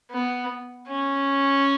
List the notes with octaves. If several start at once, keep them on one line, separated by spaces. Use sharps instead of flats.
B3
C#4